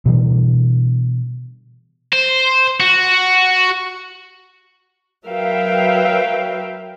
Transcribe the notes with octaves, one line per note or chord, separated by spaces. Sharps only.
B2 D3 E3 G3
C5
F#4
F#3 A#4 B4 E5 F5 G5